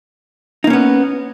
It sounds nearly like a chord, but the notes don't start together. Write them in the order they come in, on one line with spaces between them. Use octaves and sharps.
D#4 A#3 C#4 B3